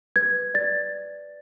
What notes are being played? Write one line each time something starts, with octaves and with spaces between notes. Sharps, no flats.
B4 G#6
D5 A6